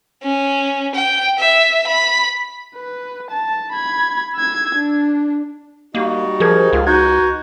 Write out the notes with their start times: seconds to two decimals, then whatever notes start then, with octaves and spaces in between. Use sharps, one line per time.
0.23 C#4
0.95 G5
1.39 E5
1.87 B5
2.76 B4
3.30 A5
3.72 B5 G#6
4.37 E6 G#6
4.75 D4
5.95 G3 A#3 D#4 F#4
6.40 F3 G#4 A#4 G#6
6.73 C#2 F4
6.87 D#4 F#4 G6 G#6